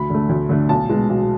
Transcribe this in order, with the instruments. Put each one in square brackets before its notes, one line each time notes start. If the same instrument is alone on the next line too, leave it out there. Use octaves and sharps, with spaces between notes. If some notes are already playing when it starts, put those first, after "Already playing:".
Already playing: [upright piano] D2 B5
D3 A3
D2
D3 A3
B1 A5
B2 G#3
B1